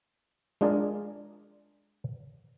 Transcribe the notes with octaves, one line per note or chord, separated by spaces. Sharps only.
G#3 D4 F4 G#4 A#4 D5